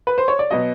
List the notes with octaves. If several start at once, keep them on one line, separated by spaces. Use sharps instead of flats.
B4
C5
C#5
D5
B2 F#3 B3 D#5